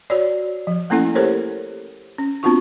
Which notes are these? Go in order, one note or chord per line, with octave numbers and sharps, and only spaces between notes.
F#4 C#5 D5
F3
A3 A#3 C#4 E4 A4 F#5
G4 A4 A#4 C5 C#5
C#4
B3 C4 D4 F4 F#4 C#6